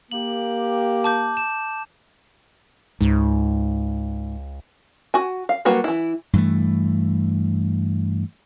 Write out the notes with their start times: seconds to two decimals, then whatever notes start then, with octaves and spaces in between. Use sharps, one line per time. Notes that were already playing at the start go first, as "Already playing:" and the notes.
0.12 A#3 G4 F#7
1.04 A5 D6 G6
1.37 E7
3.01 C#2 G#2
5.14 F#4 G#5
5.49 F5
5.65 F#3 G3 A#3 F#4 B4
5.84 E3 E4
6.33 G2 E3 A3